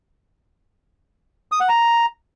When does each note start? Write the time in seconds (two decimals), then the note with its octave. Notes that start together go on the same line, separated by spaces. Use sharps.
1.52 D#6
1.60 F#5
1.69 A#5